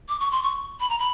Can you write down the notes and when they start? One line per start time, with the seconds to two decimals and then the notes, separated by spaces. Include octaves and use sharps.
0.09 D6
0.20 C#6
0.31 C6
0.43 C#6
0.80 B5
0.90 A#5
0.99 B5